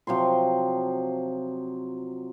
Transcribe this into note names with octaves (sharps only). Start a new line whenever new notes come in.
C3 F3 F#3 C6